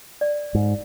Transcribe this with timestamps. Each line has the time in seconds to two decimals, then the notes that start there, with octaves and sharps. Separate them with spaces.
0.21 D5
0.55 G#2